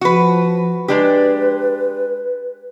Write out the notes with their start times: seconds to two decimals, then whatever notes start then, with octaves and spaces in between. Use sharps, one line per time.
0.01 F3 F#4 B4
0.88 G#3 D4 G4 B4